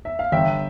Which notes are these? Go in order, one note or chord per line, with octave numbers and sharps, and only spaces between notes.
E5
F5
G1 E5 G5